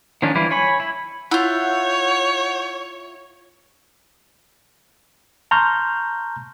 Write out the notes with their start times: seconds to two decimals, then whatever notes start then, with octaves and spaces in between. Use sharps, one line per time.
0.22 D#3 F3 C#4 D4
0.35 E3 G3 E4 F4
0.51 C#5 G#5 B5
0.80 E4
1.31 E4 F4 C#5 F#5 G6
5.51 A5 A#5 C6 C#6 F6 G6